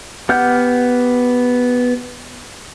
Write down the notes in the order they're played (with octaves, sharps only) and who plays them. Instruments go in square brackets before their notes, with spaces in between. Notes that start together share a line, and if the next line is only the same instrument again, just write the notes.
[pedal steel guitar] B3 G4 F#5 F6 G6